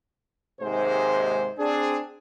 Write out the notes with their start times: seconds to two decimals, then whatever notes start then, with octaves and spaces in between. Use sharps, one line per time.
0.61 D#2 G#2 C3 G#3 C5
1.59 C4 D4 G#4